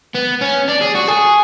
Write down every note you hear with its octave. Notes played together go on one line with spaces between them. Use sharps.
B3
C#4
D4
G#4
F#4
G#4